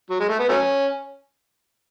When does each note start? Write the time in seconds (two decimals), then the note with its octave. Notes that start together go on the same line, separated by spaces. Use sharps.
0.10 F#3
0.20 G#3
0.29 A3
0.39 B3
0.49 F#3 A3 C#4